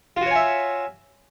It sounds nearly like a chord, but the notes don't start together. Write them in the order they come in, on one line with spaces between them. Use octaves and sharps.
F4 F#4 C#5 G#5 E5